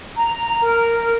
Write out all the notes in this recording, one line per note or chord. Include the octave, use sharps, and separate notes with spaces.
A#5
A#4